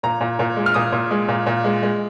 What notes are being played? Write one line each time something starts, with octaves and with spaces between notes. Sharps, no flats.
A#2 A#5
A#2
A#2
G#3
F6
A#2 D#6
A#2
G#3
A#2
A#2
G#3
G#3